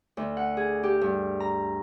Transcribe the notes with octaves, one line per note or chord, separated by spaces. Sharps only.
D2
F#5
G#4
G4
G2
A#5